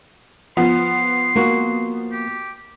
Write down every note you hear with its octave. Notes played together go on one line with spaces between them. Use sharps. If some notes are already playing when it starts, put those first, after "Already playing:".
F3 B3 C6
A#3 F#4
G4